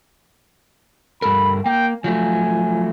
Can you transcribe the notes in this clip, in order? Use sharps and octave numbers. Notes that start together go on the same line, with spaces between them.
G2 A4 A#4 B5
A#3 G5
F3 F#3 A3 G#5